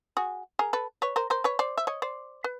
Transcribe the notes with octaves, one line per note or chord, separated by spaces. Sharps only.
F#4 G#4
G#4 A#4
A4 B4
B4 C#5
A#4 C5
A#4 C5
B4 C#5
C5 D5
E5
C#5 D#5
C5 D5
B4